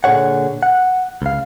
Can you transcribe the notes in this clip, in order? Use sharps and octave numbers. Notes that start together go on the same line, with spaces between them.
A#2 D3 G#4 C#5 F#5
F#5
C#2 F5